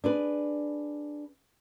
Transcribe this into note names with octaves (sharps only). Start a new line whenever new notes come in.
D4 G#4 B4